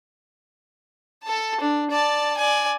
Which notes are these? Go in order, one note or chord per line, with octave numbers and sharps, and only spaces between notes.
A4 A5
D4
D5 A5
D5 G#5